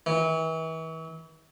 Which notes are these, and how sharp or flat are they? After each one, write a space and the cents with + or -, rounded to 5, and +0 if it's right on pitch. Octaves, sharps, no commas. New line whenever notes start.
E3 -35